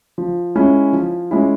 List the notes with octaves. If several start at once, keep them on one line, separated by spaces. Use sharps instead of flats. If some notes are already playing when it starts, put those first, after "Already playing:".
F3
G#3 C#4 E4
F3
G#3 C#4 E4